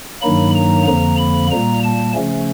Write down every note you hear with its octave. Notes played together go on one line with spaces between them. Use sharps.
G2 D#3 F#3 A#3 D#4 B5
A#5
F2 D3 F3 A#3 A#5
B5
A#2 G3 A#3 A#5
A5
C#3 F3 A3 C#4